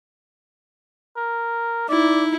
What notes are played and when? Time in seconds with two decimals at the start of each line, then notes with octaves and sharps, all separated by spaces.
1.17 A#4
1.89 D#4 E4 D5